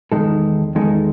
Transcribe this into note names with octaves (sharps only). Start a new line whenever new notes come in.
E2 D#3 G#3 D#4 A4
E2 D#3 G#3 D#4 A4